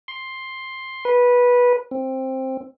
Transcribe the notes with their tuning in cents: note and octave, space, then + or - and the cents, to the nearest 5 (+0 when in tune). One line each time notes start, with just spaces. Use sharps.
C6 +10
B4 -15
C4 +10